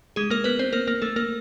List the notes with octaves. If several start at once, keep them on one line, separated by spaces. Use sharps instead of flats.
G#3 G#4
A#3 A#4
B3 B4
C4 C5
A#3 A#4
A#3 A#4
A3 A4
A#3 A#4